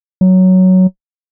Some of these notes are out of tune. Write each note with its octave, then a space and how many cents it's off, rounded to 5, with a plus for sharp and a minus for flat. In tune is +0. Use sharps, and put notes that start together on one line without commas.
F#3 +5